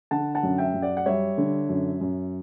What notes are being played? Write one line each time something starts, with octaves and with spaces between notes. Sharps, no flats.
D3 F#5 A5
F#5 A5
F#2
E5 G5
F#2
D5 F#5
F#5
G3 C#5 E5
D3
F#2
F#2